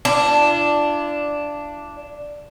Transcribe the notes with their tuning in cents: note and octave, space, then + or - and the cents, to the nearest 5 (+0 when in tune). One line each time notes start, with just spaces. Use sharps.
D4 +0 F4 -45